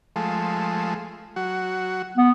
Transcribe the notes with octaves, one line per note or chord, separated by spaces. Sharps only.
F3 G#3 A3
F#3 F#4
B3